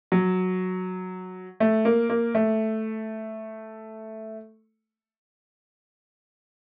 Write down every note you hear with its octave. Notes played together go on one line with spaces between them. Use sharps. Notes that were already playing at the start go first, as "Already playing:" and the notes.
F#3
A3
A#3
A#3
A3